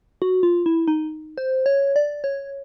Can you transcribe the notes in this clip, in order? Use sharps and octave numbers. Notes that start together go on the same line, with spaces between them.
F#4
F4
E4
D#4
C5
C#5
D5
C#5